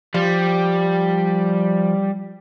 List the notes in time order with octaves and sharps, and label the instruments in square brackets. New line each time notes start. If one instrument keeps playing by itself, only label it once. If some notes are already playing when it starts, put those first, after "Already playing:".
[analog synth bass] F3 [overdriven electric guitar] G3